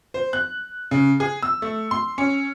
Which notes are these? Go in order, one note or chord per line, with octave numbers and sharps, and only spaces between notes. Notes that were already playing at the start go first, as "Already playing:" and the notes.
C5
F#6
C#3
G#4
E6
A3
C6
C#4